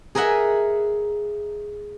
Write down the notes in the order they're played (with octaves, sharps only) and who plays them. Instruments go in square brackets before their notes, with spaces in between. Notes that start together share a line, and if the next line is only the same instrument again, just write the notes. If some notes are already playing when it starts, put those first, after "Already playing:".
[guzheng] G#4 A#4 D#5 E5 F#5